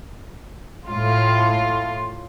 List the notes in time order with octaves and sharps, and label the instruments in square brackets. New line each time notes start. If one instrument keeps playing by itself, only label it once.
[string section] A2 F4